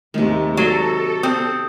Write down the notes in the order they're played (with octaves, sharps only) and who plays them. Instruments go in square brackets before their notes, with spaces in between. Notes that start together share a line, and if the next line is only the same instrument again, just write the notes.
[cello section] D#2 G#3 A3 [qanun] C3 D#3
[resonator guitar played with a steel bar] F#3 [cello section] A4
[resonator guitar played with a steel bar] C4 [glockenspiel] D#6